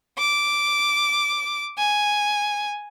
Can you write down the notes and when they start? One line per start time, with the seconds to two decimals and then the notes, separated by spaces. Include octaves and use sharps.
0.18 D6
1.78 G#5